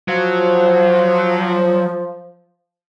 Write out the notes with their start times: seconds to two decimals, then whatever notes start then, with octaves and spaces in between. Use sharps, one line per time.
0.08 F3 F#3